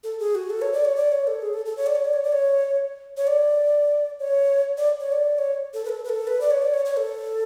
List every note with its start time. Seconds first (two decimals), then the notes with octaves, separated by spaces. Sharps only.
0.04 A4
0.19 G#4
0.35 F#4
0.50 A4
0.62 C#5
0.73 D5
0.85 C#5
0.96 D5
1.12 C#5
1.27 A4
1.42 G#4
1.53 A4
1.66 A4
1.77 C#5
1.87 D5
1.95 C#5
2.05 D5
2.13 C#5
2.23 D5
2.32 C#5
3.17 C#5
3.27 D5
4.19 C#5
4.78 D5
5.00 C#5
5.12 D5
5.35 D5
5.38 C#5
5.74 A4
5.85 B4
5.89 A4
6.04 B4
6.09 A4
6.27 B4
6.41 D5
6.51 C#5
6.62 D5
6.74 C#5
6.85 C#5
6.97 A4